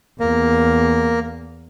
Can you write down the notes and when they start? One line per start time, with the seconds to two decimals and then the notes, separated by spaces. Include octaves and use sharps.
0.20 E2 A#3